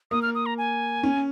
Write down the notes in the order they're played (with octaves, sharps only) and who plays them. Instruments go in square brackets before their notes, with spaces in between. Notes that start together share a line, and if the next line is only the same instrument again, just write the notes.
[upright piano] A#3 [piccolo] D#6
[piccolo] F6
D#6
A#5
G#5
[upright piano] C#4